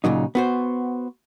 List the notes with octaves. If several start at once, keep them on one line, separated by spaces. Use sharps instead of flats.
A#2 C#3 F#3 D#4
B3 F#4 C5